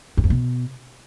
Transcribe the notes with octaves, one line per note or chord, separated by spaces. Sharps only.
F#2
F2
B2